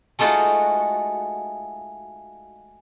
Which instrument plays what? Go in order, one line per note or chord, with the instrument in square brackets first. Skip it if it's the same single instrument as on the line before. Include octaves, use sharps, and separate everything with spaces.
[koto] G#3 A3 D#4 F4 F#4